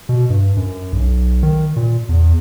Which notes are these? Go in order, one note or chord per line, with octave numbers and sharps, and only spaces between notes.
B2
G2
F#2
B1
D#3
A#2
E2